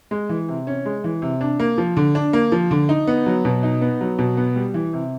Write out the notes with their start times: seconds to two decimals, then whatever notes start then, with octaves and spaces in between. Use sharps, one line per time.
0.11 G#3
0.29 E3
0.48 C3
0.67 C#4
0.85 G#3
1.04 E3
1.22 C3
1.41 D4
1.60 A#3
1.78 F3
1.97 D3
2.15 D4
2.33 A#3
2.52 F3
2.71 D3
2.89 D#4
3.07 B3
3.26 F#3
3.45 B2
3.63 D#4
3.82 B3
4.01 F#3
4.19 B2
4.37 B3
4.56 G3
4.74 E3
4.93 C3